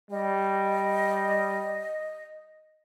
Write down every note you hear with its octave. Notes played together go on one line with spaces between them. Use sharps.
G3 D#5